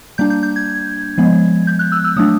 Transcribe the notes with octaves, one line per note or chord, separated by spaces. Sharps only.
G3 A#3 D4 G6
G6
G6
G#6
F3 G#3 B3
G6
F#6
E6
E6
F#3 A3 D4 D#6